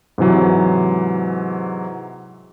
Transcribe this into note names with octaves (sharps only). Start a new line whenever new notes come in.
G#2 C3 E3 F#3